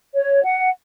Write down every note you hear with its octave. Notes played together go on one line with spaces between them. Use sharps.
C#5
F#5